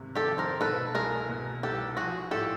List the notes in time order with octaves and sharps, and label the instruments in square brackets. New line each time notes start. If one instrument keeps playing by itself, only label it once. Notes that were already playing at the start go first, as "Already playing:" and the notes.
Already playing: [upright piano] G#1 C3
[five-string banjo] G4 A4
[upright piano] F2
[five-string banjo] A#4 C5
[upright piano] B2 [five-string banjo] A4 B4
[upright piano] C2 [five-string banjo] G#4 A#4
[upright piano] B2
[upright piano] C2 [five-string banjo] G4 A4
[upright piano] F3 [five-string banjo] F#4 G#4
[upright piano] A2 [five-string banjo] G4 A4